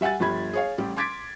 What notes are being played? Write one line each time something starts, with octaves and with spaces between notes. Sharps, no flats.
G3 E5 F#5 G#5 A6
G1 F3 G3 B5 G#6
G#4 C#5 F5
A1 G3 G4
C6 D6 G#6 A6 B6 D7